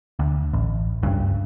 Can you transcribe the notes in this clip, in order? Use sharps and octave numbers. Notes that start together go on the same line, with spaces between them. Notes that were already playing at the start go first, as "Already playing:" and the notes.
D2
A1
F#1 C#2 G2